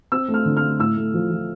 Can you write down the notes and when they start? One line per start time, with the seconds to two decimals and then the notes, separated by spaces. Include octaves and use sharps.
0.12 C4 E6
0.28 A3
0.34 F6
0.45 D3
0.57 F6
0.62 A3
0.79 A2 E6
0.97 A3
1.14 F3
1.31 F3